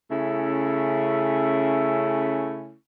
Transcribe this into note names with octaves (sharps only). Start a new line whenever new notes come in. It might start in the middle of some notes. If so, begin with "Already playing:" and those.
C#3 A3 C#4 E4